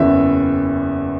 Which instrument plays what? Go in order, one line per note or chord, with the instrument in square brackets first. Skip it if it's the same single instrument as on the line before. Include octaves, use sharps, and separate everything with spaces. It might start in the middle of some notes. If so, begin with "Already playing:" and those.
Already playing: [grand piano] F#1 E2 C#3 E3 E5